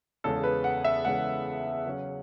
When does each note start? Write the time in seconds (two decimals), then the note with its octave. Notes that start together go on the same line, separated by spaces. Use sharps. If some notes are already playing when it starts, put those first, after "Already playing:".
0.24 E2 C#3 G#3 A4
0.43 B4
0.64 F#5
0.84 E5
1.05 E2 C#3 G#3 F#5
1.86 C#3 F#3 C#4